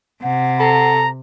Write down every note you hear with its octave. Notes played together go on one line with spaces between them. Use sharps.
C3 F#5
A4 A#5